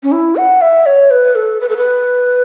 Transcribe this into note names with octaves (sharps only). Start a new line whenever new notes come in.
C#4
E4
F#5
E5
C#5
B4
A4
B4
A4
B4